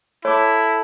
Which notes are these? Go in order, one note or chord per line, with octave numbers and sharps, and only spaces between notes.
E4 A4 C#5 A5 D6